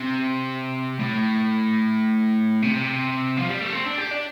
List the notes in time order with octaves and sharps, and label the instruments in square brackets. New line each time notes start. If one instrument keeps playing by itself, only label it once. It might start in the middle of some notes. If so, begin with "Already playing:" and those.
Already playing: [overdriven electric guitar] C3
A2
C3
F3
G3
A3
C4
D4
G4
D4